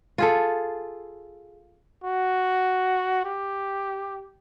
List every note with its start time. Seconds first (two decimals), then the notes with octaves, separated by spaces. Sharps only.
0.18 F4 G#4 A4
2.04 F#4
3.25 G4